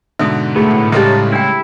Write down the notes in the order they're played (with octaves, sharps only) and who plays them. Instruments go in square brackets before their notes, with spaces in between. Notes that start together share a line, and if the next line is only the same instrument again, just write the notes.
[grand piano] G#2 B2 D3 [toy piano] E5 D#6
[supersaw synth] A2 [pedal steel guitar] A3 B3 [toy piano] G#4
[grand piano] C#3 G3 G#3 [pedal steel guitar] D#4 A5 [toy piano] G4 A4 D6
[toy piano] D4 G5 [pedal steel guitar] E4